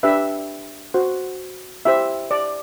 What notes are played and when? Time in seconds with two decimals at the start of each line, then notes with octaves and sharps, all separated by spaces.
0.03 D4 G4 B4 E5
0.94 F#4 C5
1.85 E4 G4 C5 E5
2.31 D5